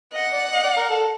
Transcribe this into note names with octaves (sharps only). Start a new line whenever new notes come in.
D#5 F#5
D5
D#5
D5
A#4
A4